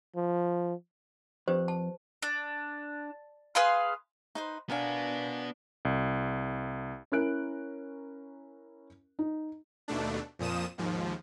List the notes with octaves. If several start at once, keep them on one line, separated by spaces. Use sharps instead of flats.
F3
F2 G4 B4 C5
A5
D4
G#4 B4 F5 C6
D#4 B4 C5
B3 D4 F#4 A#4 F5 G#5
C2
C#4 E4 A#4 F#6 D7
D#4
D#2 B2 A3 D4
F2 A#2 F3 D#6 E7
D#2 G#2 F3